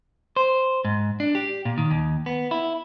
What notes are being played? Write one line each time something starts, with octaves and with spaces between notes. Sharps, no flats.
C5
G#2
D4
G4
A#2
D#3
D#2
B3
E4